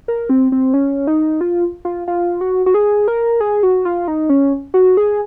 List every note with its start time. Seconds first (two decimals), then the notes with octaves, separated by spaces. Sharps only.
0.08 A#4
0.29 C4
0.52 C4
0.74 C#4
1.07 D#4
1.41 F4
1.85 F4
2.08 F4
2.41 F#4
2.66 F#4
2.74 G#4
3.08 A#4
3.40 G#4
3.63 F#4
3.85 F4
4.08 D#4
4.29 C#4
4.74 F#4
4.97 G#4